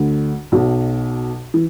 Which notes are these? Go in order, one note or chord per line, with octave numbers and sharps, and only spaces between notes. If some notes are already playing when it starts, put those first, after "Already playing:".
Already playing: D2 D3
B1 B2
E3